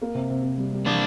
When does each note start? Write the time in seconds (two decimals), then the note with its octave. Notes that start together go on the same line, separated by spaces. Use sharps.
0.02 A#3
0.15 C3
0.30 C3
0.43 C3
0.58 G3
0.73 G3
0.86 E3 A#3 D4